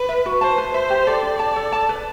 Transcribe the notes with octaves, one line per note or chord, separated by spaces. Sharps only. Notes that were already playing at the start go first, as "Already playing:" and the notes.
Already playing: B4
E5
F#4
C5 A5
B4
C5 E5
G4
A4 D5
D4
A5
A4
A5
B4